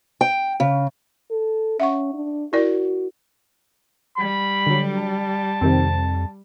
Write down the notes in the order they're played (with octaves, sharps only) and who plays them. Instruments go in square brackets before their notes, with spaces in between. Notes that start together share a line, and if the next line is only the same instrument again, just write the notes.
[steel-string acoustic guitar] G5
C#3
[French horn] A4
[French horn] C#4 [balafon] E5 F#5 C#6
[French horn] D4
[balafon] E4 A#4 D5 [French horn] F#4
[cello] G3 [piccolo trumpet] B5
[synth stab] D3 F#3
[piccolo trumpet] A5
[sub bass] F2 [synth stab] C3 D#3 C4